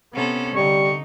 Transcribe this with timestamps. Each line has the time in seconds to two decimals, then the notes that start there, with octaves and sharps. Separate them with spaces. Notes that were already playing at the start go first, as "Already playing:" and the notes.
0.14 C3 B3 C#4 A4
0.56 D3 G3 D#4 C#6